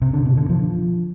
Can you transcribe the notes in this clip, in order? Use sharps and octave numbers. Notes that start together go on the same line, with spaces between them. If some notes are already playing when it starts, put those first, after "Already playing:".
C3
D3
B2
D3
F3